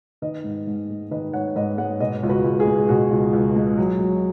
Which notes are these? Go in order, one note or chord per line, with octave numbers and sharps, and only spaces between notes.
D#3 B4 D#5
G#2
G#2
G#3
D#3 B4 D#5
G#2 C#5 F#5
G#2 B4 D#5
G#3 C#5 F#5
B2 B4 D#5
C#2
F#4 B4
C#2
G#4
G#3
B2 F#4
C#2
C#2
G#3
F#3
F#3